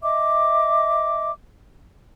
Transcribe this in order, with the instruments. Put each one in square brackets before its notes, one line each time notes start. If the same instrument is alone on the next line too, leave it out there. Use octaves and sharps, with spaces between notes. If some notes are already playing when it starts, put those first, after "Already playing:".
[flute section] D#5 E5 D6